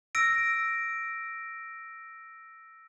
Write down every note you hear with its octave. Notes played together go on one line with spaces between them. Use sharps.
E6 A#6 D7